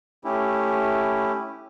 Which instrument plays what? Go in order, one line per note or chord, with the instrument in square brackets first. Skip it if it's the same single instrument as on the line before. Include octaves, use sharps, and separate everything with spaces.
[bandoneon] A3 C#4 E4 G4